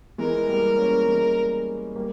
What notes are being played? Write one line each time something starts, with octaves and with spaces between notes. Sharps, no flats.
E3 G#3 A#4
G3 A#3
A#3 C#4
E3 G#3
G3 A#3